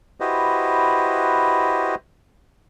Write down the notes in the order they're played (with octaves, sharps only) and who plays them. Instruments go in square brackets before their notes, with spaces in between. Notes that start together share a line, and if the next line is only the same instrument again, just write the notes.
[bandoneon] E4 F#4 G4 B4 C5 D#5